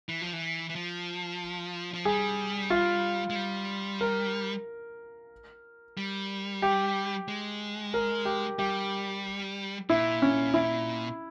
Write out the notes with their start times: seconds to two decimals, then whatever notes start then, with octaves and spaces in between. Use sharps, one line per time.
0.09 E3
0.22 F3
0.33 E3
0.69 E3
0.75 F3
1.94 F3
2.05 G3 G#4
2.70 F4
3.30 G#3
3.35 G3
4.01 A#4
5.97 G3
6.62 G4
7.28 G#3
7.94 A#4
8.25 G4
8.58 G3 G4
9.90 A#2 E4
10.22 C#4
10.54 E4